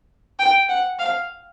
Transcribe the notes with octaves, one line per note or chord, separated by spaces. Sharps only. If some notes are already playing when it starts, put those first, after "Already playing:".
G5
F#5
F5